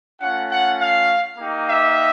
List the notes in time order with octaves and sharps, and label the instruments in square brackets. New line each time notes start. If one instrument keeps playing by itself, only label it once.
[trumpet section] A3 C#4 F4 F#5
F#5
F5
A#3 D#4 G4
E5